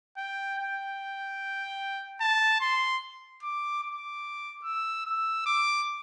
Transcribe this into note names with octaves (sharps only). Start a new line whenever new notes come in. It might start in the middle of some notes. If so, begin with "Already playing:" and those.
G5
G5
A5
C6
D6
D6
E6
E6
D6